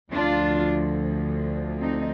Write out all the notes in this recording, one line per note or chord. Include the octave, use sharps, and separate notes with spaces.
D2 D3 F3 D4 F4
C4 D#4